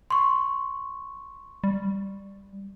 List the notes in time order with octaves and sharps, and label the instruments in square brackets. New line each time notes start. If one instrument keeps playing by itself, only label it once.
[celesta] C6 C#6
[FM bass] G3